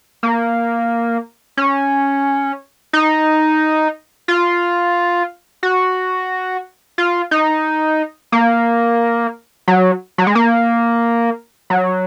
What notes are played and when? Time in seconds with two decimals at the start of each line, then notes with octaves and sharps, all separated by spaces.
0.23 A#3
1.57 C#4
2.93 D#4
4.28 F4
5.63 F#4
6.98 F4
7.31 D#4
8.32 A#3
9.68 F#3
10.18 F#3
10.27 G#3
10.35 A#3
11.70 F#3